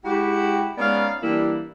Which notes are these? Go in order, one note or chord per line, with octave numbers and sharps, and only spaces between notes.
G#3 E4 F#4 G4
G#3 B3 C#4 D#4 D5 F5
E3 G3 A#3 D4 E4